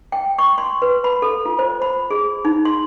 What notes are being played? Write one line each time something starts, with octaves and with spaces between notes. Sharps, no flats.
G5
C#6
C6
B4
B5
A4
F4
C5
B5
G#4
D#4
C6